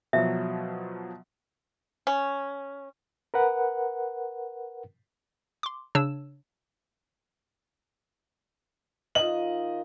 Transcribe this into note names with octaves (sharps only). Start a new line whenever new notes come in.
B2 F3 F#3 E5
C#4
A#4 B4 F#5
C6 D6
C#3 D4 C#5 E6 E7
D#3 F4 D#5 F#7